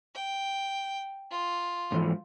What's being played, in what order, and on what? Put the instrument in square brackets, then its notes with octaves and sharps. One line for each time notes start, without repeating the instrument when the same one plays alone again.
[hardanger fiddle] G5
F4
[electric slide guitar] G#2 E3 F3